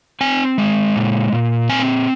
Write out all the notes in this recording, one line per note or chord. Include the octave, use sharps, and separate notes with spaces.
C4 G#5
G#3
A#2
A#2
C4 G#5